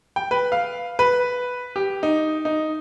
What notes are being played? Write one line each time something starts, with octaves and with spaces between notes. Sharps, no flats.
G5
B4
F5
B4
G4
D#4
D#4